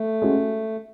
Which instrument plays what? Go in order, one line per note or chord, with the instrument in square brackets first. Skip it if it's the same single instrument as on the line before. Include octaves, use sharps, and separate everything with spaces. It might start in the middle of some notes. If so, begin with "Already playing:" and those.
Already playing: [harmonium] A3
[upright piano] G#3 C#4 F#4